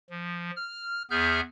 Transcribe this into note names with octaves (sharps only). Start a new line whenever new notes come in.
F3
F6
E2 B3 G#4 E5 F6 G6